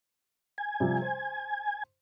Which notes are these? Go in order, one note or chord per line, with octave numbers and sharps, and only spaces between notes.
G#5
C3 F3 G3
C5